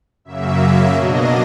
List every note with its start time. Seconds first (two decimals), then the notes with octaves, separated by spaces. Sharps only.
0.25 F#2 C#3 F#3 A#3 E5
0.58 E5
0.92 B2 F#3 A#3 D4 D#5